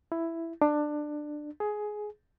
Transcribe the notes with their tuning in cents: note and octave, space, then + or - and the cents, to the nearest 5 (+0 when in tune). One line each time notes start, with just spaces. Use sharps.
E4 +10
D4 +20
G#4 +15